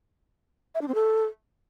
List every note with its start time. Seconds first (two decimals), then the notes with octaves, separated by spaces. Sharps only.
0.75 E5
0.81 D4
0.88 C4
0.95 A4